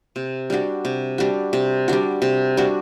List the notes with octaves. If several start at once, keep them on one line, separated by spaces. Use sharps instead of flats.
C3
G3 D4 F#4
C3
G3 D4 F#4
C3
G3 D4 F#4
C3
G3 D4 F#4